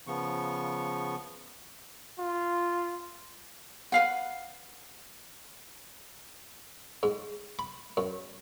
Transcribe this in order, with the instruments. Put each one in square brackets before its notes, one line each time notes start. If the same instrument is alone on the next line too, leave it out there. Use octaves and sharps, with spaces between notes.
[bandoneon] C#3 F3 B3 C#6
[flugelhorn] F4
[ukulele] B4 F5 F#5
[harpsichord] G#2
B5
F#2